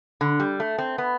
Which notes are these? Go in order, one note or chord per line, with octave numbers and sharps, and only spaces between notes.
D3
G3
A3
C4
B3